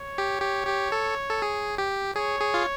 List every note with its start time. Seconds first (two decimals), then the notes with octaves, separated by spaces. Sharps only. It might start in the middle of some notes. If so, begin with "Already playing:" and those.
Already playing: C#5
0.18 G4
0.42 G4
0.67 G4
0.92 A4
1.30 A4
1.42 G#4
1.78 G4
2.16 G#4 C#5
2.41 G#4
2.54 F4